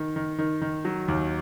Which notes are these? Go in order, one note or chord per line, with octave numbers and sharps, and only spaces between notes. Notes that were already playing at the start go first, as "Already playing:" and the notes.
Already playing: D#3
D#3
D#3
D#3
F#3
D#2